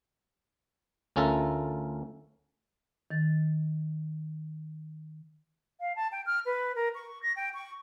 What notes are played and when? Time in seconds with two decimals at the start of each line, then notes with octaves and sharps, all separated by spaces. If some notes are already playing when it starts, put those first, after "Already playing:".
1.16 D2 C#4 F4 A4 A#4 E5
3.11 D#3 A6
5.80 F5
5.95 A5
6.12 G5
6.26 F6
6.45 B4
6.75 A#4
6.95 C#6
7.22 A#6
7.36 G5
7.54 C#6